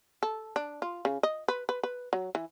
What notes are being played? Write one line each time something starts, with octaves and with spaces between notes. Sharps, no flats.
A4
D4
F4
C#3
D#5
B4
B4
B4
F#3
E3